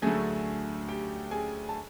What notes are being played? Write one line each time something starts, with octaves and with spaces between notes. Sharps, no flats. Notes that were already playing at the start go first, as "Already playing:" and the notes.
D2 D3 F#3 A3 G#4 G#5
G4 G5
G#4 G#5
A5